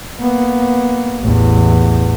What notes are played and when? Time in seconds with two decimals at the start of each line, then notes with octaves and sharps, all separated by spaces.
0.21 A#3 B3
1.21 A1 E2